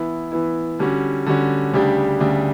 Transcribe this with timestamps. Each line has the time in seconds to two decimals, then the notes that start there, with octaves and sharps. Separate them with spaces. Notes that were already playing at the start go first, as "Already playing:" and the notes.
Already playing: E3 B3 E4
0.32 E3 B3 E4
0.79 D3 G3 C#4 F#4
1.26 D3 G3 C#4 F#4
1.73 D2 C#3 G3 D4 G4
2.20 D2 C#3 G3 D4 G4